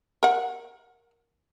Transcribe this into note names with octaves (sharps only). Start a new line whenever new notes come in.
A#4 F#5